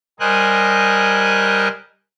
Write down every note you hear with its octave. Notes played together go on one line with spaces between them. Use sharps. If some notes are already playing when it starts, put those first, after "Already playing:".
G3 A#4 C5 D#5 G#5 F#6